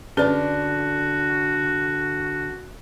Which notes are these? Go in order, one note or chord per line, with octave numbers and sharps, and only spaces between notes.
D3 C#4 F#4 G#4 B4 D5